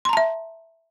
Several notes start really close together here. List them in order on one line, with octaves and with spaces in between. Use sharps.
C6 A#5 A5 E5